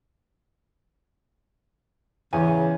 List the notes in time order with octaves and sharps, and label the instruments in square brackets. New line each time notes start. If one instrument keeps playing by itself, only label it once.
[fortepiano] E2 [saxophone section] C#3 [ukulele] G#5